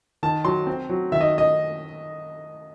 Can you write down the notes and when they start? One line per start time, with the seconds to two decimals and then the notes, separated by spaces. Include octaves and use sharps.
0.23 D#3 A5
0.45 F#3 C6
0.67 C4
0.89 F#3
1.12 D#3 E5
1.21 D#5
1.38 D#5